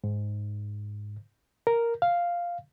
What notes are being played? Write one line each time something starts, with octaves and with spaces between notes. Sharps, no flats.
G#2
A#4
F5